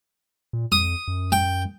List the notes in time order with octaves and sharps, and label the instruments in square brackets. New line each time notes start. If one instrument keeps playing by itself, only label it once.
[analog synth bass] A#2
[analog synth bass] F2 [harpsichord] D#6
[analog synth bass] F#2
[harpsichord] G5